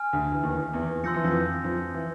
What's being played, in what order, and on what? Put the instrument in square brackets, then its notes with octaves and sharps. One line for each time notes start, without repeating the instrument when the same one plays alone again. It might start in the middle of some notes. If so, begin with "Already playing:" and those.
Already playing: [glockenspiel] G#5 F6
[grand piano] D2 D3
E3
D#2 D#3
E2 E3
[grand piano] F3 [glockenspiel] C6 E6 G6 A#6 C#7
[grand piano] E3
F2 F3
F2 F3
E3